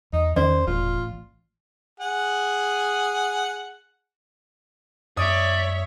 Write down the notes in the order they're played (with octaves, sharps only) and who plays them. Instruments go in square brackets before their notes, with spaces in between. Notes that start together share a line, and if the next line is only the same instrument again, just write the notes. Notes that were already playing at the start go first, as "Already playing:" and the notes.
[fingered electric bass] E2 [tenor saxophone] D#4
[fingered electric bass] E2 C#4 [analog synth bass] D#3 [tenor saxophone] C5 [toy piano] D5
[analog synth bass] E1 [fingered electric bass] A1 [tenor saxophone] F4
[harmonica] G#4 F#5
[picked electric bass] F#2 G#3 [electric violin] C#5 E5 [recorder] D5 [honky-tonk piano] D#6